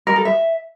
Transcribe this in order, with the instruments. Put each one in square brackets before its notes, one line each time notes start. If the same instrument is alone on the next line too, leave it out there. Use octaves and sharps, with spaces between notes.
[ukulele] A#4
A4
E5